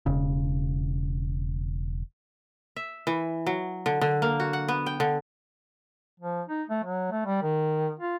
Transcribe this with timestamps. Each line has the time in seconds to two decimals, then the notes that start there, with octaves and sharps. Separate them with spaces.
0.06 E1 C#3
2.76 E5
3.07 E3
3.47 F#3
3.86 D3
4.01 D3
4.22 A#3
4.40 F#4
4.53 F#5
4.68 B3
4.86 G5
5.00 D3
6.20 F3
6.48 D#4
6.69 A3
6.84 F#3
7.11 A3
7.26 G3
7.43 D#3
8.00 F4